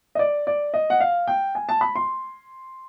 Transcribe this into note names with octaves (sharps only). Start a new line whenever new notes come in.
D#5
D5
D5
D#5
F#5
F5
G5
G#5
A5
B5
C6